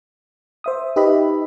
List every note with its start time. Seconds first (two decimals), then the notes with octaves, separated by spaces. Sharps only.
0.64 C5 E5 D#6
0.96 D#4 G4 B4 D#5 E5 B5